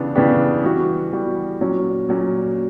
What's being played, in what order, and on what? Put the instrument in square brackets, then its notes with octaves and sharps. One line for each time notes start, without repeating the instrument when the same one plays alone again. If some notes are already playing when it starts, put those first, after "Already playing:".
Already playing: [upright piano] C#3 E3 B3 D4 G4
C#3 E3 B3 D4 G4
E3 G3 B3 F#4
E3 G3 B3 F#4
A#2 F#3 C#4
A#2 F#3 C#4